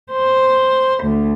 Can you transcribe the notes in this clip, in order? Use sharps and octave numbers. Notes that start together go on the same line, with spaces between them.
C5
D2